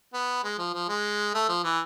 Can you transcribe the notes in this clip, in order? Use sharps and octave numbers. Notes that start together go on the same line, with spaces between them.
B3
G#3
F3
F3
G#3
A3
F3
E3